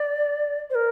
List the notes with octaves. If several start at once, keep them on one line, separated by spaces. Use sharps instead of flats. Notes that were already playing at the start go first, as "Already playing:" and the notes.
Already playing: D5
C5
A#4